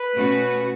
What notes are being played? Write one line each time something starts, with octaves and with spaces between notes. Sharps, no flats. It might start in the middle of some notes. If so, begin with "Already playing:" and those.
Already playing: B4
B2 A3 C#4 F#4